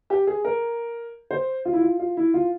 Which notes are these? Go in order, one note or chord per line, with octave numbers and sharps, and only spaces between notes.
G4
G#4
A#4
C5
F4
E4
F4
F4
E4
F4